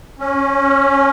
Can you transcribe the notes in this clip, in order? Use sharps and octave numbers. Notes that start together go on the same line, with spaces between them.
C#4